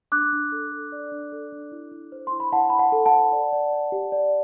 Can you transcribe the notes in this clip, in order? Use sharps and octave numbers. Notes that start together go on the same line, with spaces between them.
D4 D6 F#6
D4
A4
A4
D5
D4
A4
D4
E4
E4
C5
E4 C6
B5
E4 F#5 A5
E4 B5
F#5 A5
A4
F#5 A5
C5
D5
D5
D5
G4
D5